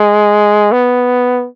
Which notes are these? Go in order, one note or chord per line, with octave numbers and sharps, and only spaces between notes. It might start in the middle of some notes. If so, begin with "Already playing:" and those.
Already playing: G#3
B3